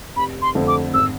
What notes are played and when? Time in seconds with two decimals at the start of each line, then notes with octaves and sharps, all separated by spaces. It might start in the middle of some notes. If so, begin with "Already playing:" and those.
0.16 F1 B5
0.42 C6
0.55 F2 D3 A3
0.68 D6
0.93 G#1 E6